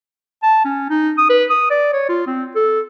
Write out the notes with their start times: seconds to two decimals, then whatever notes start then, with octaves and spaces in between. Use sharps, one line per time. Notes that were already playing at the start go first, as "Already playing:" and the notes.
0.43 A5
0.65 C#4
0.90 D#4
1.18 D#6
1.30 B4
1.50 D#6
1.70 D5
1.94 C#5
2.09 F4
2.27 C4
2.56 A4